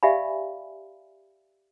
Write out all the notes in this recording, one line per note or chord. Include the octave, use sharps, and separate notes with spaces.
G4 D5 E5 F5 G#5 B5